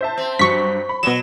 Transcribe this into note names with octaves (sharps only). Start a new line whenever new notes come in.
C5 E5 A5
C4
G2 F#3 C#6 B6
B5
B2 F#3 E7